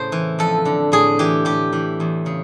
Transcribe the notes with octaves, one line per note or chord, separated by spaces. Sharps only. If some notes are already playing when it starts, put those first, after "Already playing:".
Already playing: A2 C#3 C5
E3
F2 A4
D3
A2 G#4
E3 G4
A2 G4
E3
E2
C#3